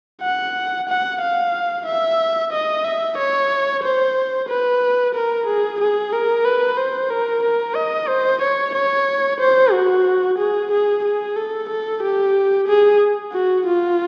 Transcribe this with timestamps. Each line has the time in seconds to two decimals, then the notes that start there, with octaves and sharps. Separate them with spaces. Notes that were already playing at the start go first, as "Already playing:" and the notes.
0.22 F#5
0.89 F#5
1.22 F5
1.86 E5
2.52 D#5
2.85 E5
3.18 C#5
3.83 C5
4.49 B4
5.14 A#4
5.46 G#4
5.80 G#4
6.13 A#4
6.45 B4
6.77 C5
7.10 A#4
7.43 A#4
7.75 D#5
8.08 C5
8.41 C#5
8.74 C#5
9.40 C5
9.72 F#4
10.38 G#4
10.71 G#4
11.04 G#4
11.36 A4
11.69 A4
12.02 G4
12.67 G#4
13.33 F#4
13.66 F4